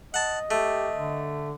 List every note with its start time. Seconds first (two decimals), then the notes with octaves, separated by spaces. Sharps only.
0.14 D#5 F#5 A5
0.51 A3 G4
0.95 D3